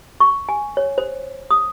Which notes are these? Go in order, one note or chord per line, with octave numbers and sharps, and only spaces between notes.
C#6
G#5
C#5
C5
D#6